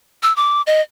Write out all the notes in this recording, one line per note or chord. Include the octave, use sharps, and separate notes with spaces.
E6
D6
D#5